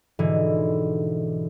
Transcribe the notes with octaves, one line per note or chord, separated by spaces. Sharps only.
G#2 B2 D3 E3